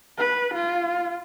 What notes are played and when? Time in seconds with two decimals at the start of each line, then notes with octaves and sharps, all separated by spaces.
0.18 B4
0.55 F4